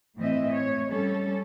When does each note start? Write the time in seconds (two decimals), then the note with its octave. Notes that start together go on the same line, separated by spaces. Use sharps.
0.17 A2 E3 C4 D#5 E5
0.54 C#5
0.90 G3 C#4 A4